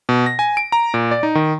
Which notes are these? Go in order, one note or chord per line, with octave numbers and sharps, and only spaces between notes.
B2
A#6
G#5
D7
A#5
A#2
D5
D#4
D#3